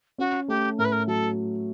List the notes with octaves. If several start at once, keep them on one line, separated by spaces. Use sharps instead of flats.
C#4 F#4
A3 G4
A2 A#4
B4
A#4
F#3 A4